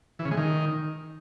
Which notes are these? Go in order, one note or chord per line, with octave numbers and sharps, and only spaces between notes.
E3
C#3
G#3
D#3